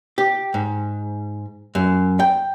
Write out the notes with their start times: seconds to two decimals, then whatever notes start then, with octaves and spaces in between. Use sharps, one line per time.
0.18 G4
0.54 G#2
1.75 F#2
2.20 G5